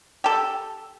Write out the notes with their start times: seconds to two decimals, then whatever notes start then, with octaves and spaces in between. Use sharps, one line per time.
0.24 G4 A4